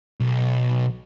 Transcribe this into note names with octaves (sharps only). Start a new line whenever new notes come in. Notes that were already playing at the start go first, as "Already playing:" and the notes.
B1